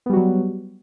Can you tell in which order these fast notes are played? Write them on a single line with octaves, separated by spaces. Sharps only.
B3 G3 F#4 F#3